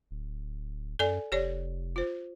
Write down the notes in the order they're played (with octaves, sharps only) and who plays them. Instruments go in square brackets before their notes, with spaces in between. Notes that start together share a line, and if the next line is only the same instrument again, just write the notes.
[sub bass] D1
[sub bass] F#2 [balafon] A4 D5 G#5
[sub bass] F1 [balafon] G4 C#5 D5
[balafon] F4 C5